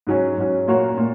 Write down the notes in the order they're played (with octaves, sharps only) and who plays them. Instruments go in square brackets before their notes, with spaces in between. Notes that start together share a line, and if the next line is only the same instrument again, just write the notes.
[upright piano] G#2 F#3 C#4
G#2 F#3 C#4
A#2 A#3 F#4 C#5
A#2 A#3